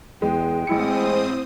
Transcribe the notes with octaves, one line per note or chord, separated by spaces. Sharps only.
E2 G#3 G5
A1 G#3 C4 E4 C5 D#6 C#7